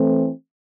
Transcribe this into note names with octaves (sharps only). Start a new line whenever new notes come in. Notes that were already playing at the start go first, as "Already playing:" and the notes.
Already playing: E3 A3 C4